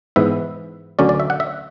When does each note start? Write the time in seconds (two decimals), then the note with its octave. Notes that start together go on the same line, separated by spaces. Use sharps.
0.16 G#2 E3 B3 E5
0.99 D2 D3 F#3 C#4 D5
1.09 D5
1.20 E5
1.30 F#5
1.40 E5